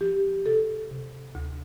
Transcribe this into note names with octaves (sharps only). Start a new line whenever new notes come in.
F3 G4
C3 A4
C3
D2